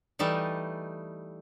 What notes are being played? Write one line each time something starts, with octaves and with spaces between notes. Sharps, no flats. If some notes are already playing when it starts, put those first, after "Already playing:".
E3 G3 A3 D#4